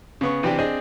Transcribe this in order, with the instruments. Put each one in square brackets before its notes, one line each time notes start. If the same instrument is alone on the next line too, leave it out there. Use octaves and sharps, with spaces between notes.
[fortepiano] C#3 B3 C#6
C3 E3 C4 D4 G4
C4 D4 G#4 D#5